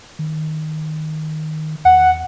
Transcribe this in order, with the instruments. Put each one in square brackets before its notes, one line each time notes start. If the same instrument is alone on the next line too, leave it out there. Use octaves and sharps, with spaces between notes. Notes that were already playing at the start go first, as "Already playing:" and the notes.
[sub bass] D#3
[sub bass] E2 [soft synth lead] F#5